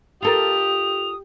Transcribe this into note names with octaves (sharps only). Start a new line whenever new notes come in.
F4 G4 A4 A#4 D#6 F7